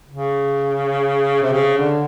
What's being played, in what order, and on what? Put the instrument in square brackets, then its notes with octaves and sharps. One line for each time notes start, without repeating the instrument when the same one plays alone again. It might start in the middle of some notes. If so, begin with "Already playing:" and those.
[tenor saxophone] C#3
C3
C#3
D3